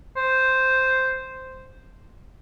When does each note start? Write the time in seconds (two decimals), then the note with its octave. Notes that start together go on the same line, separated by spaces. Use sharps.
0.17 C5